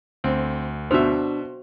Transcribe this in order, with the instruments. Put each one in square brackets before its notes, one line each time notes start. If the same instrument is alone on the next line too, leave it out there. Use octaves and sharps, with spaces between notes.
[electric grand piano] D2 [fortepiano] C4
[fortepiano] B2 E5 [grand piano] D4 F7 [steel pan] F#4 C5